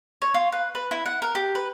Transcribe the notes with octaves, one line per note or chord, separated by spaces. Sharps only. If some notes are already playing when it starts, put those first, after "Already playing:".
C#5
F4
B4
B4
E4
F#5
A#4
G4
B4